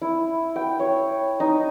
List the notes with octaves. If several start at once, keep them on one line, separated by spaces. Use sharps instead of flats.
E4
G5
C#5
D#4